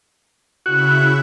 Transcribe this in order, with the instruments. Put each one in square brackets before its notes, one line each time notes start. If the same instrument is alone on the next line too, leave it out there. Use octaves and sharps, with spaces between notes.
[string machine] C#3 E4 E5 [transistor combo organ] F#4